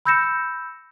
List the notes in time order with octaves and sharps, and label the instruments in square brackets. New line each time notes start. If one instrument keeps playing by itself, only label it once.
[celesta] B5 E6 G6 A#6 C#7 E7